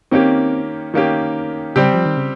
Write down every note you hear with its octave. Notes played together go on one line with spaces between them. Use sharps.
D#3 A#3 C4 C#4 G4
D#3 A#3 C#4 G4
C#3 G3 C4 G4
F3
D#3
C#3